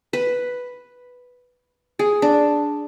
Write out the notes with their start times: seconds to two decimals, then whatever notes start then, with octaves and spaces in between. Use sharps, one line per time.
0.13 B4
1.99 G#4
2.22 D4